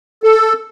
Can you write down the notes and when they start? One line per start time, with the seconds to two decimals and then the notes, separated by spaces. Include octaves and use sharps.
0.23 A4